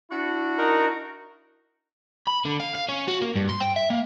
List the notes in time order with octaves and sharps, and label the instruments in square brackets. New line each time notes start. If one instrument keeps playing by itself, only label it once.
[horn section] D4 E4 F#4
[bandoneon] D#4 A#4
[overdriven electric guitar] B5
D3
F5
F5
C#4
F#4
A#3
G2
C6
G5
E5
A#3